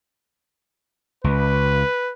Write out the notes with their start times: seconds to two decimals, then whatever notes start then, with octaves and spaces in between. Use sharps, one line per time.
1.24 C#2 B4